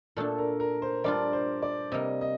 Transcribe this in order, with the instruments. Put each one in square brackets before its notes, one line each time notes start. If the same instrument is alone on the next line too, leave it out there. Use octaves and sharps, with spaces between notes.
[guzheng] A#2 A3 D4 [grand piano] A4
[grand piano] A#4
A#4
C5
[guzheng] G3 D4 F4 [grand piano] D5
[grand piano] C5
D5
[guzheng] C3 G3 A#3 [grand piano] D#5
[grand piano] D#5